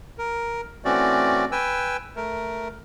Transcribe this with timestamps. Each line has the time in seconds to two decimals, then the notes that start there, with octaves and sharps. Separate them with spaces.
0.18 A#4
0.85 E3 A3 C4 C#4 F#4 D5
1.52 B4 G5 G#5 E6
2.16 A3 A#4